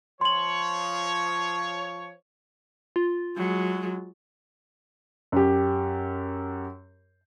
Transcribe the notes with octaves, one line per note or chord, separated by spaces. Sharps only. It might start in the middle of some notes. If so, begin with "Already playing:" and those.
F3 C#5 C6 F#7
F4
F#3 G#3
F#2 G4